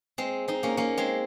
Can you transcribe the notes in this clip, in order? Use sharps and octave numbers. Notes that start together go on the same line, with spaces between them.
G#3 C4
C4 D#4
A#3 C#4
A#3 C#4
G#3 C4